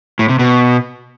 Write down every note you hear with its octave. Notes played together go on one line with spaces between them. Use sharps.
A2
C3
B2